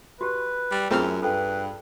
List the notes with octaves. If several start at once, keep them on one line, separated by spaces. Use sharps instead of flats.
F#4 G4 B4
G3
F#2 A3 C4 D4 F4 G#4 F6
G2 A4 B4 G5